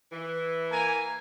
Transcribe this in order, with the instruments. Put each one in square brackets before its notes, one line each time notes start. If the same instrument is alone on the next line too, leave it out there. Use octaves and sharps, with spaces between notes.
[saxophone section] E3
[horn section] A#3 G#5 A#5